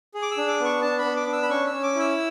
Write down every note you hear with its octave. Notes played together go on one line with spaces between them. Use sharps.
G#4
D6
E6
D4
D6
B3
C#6
D4 A5
B5
B3
D6
D4
E6
B5
C#4 C#6
E6
C#4
D6
E4 E6